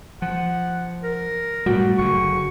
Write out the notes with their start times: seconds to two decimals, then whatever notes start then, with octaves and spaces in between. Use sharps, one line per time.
0.22 F3 F#5
1.03 A#4
1.66 F#2 A2 G3 F#4
1.98 F#1 D3 C#6